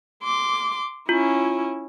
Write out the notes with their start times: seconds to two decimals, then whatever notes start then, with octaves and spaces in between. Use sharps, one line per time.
0.23 C6 D6
1.09 C#4 E4 F4